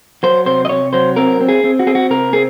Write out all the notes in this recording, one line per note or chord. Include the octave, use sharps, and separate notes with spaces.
F#3 C5
C3 C5
D#5
C3 C#5
F#3 C5
C4 A#4
C4
G#4
C4
F#4
C4 G#4
F#4
C3 A#4
C4 G#4